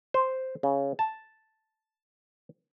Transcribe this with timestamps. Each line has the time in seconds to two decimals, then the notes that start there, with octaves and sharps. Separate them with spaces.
0.14 C5
0.63 C#3
0.99 A5